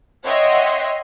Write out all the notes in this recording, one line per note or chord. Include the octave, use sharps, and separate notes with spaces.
C#5 D#5 E5 F#5 G5 C6